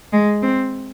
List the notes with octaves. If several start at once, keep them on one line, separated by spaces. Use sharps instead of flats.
G#3
C4